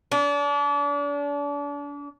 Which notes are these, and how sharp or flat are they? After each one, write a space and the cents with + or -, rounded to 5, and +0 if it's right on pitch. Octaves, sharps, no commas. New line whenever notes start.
D4 -35